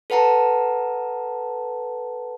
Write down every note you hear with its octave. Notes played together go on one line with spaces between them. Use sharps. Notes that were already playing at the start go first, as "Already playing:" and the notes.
A4 B4 F#5 A5 A#5